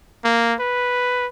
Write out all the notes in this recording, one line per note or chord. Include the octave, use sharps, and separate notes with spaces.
A#3
B4